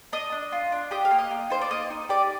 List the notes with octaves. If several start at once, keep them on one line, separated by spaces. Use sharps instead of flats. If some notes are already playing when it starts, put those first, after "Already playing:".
D4 D#5
D4
F4
D4
G4 D#5
F5
A#3
D#5
A#3
D#4 C5
D5
A#3 D#5
D#4
G4 D5